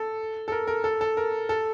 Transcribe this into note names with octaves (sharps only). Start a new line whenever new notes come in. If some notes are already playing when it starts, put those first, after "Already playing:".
Already playing: A4
A4
A#4
A#4
A4
A4
A#4
A4